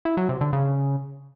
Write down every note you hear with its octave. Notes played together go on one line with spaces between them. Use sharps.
E4
F#3
C3
D3
C#3